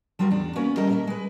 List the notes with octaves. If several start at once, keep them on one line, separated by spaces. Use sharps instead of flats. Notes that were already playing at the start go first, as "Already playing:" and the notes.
F3 G3 F4 F#4 A#4
E2 D4
A#3 B3 C#4 F#4 A#4
D#2 G3 A4 A#4 D#5 E5
A#2 A#4 D#5 E5
G#3 B4